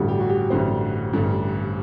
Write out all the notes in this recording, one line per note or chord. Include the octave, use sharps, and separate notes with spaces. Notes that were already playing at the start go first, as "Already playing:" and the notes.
Already playing: A1 G2 D3 G3 F#4
G4
F#4
G4
A1 G2 D3 G3 C5
A1 G2 D3 G3